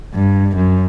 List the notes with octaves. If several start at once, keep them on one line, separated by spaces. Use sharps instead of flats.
G2
F#2